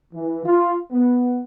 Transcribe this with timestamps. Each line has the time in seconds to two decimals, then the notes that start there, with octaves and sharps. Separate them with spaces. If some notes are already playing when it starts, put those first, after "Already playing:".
0.14 E3
0.46 F4
0.92 B3